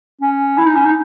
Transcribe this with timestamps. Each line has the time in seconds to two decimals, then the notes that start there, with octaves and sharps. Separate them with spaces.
0.22 C#4
0.58 E4
0.67 D#4
0.76 C#4
0.85 D#4